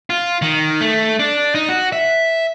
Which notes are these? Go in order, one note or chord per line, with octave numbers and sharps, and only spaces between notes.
F4
D#3
A3
D4
D#4
F#4
E5